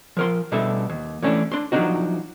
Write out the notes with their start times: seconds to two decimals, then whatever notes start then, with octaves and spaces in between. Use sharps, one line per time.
0.17 F3 A#4 C6
0.52 B2 D3 G3 A4 E5
0.90 D#2
1.22 E3 A3 C#4 D4
1.52 D4 C6
1.72 F3 F#3 A3 D4 D#4 F#4